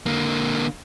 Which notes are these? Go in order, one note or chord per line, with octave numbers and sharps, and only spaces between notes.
D3 A#3